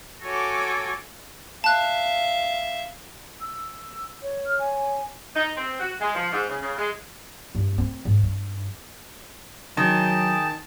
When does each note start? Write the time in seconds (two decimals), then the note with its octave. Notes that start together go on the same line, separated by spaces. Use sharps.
0.23 F#4 A4 C#5 G#5 D6
1.64 E5 F5 A5 F#6
3.41 E6
4.23 C#5
4.46 F6
4.59 G#5
5.36 D#4
5.57 C4
5.80 F#4
6.00 G#3
6.14 F3
6.33 G#2
6.49 C#3
6.62 C#3
6.78 G#3
7.55 G2
7.78 C4
8.05 G#2
8.23 G2
9.77 D#3 F#3 G#4 D#5 G5 A5